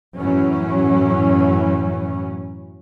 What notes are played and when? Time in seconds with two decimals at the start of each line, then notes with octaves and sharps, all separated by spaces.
0.16 F#2 A2 E3 F#3 C#4